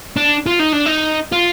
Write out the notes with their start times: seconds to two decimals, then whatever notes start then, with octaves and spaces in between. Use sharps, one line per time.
0.17 D4
0.46 F4
0.59 D#4
0.73 D4
0.86 D#4
1.32 F4